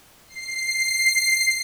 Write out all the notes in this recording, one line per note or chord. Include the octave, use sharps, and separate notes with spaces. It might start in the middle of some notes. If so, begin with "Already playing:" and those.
C7